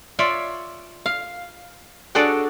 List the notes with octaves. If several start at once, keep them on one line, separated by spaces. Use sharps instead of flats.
F4 C#5 D5 E5
F5
D4 F#4 G#4 A4 C#5 D5